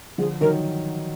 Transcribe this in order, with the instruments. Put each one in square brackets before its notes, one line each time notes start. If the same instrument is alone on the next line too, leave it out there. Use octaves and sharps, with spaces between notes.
[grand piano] D3 F3 [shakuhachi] G#4
[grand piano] D#3 F#3 [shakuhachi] A#4